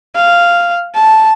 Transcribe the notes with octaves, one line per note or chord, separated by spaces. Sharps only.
F5
A5